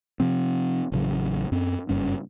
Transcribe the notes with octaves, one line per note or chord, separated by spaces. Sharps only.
C3 F3 C4
A1 C#3 F#3
F#2 C4
F#1 G2 C#4